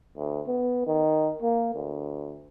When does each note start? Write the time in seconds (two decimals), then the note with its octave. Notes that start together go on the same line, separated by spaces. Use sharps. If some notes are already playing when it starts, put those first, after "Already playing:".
0.17 D2
0.47 B3
0.87 D#3
1.42 A#3
1.74 D2